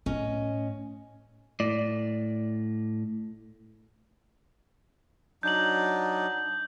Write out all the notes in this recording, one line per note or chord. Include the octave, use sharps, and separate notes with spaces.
A2 C#4 D#5
A2 D5
F#3 D4 D#4 G6 F#7